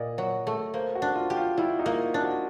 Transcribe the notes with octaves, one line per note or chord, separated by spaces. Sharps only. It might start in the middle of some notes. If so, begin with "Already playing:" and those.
Already playing: A#2 D5 D#5
F#3
A3
A#3 C5
F#4
D4
F4
G4
F4
G3 E4
D#4
A#3
D4
F#4